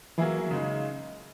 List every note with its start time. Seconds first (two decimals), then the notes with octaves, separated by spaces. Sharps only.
0.18 E3 F#3 A#3 E4 G#4
0.51 C#3 G#3 D#4